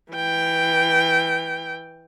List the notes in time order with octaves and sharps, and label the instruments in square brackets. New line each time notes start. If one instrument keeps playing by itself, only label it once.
[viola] E3 G5